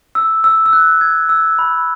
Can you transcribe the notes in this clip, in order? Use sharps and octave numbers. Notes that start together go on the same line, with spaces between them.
E6
E6
E6
F#6
G#6
E6
B5